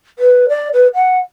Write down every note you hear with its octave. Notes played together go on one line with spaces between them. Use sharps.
B4
D5
B4
F#5